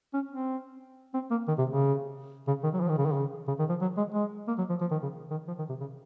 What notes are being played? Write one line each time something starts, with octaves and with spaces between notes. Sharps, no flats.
C#4
C4
C4
A#3
D#3
C3
C#3
C#3
D#3
F#3
F3
D#3
C#3
D#3
C#3
C#3
D#3
F3
F#3
G#3
G#3
A#3
F#3
F3
F3
D#3
C#3
D#3
F3
D#3
C3
C#3